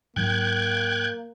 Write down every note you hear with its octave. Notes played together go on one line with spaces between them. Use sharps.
G#2 F#3 A#3 G5 F#6 G#6